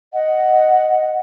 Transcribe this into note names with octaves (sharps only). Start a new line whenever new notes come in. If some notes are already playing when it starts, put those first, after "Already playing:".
D#5 F#5